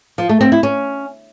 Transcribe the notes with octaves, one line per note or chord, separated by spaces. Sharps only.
F3
A3
C4
E4
C#4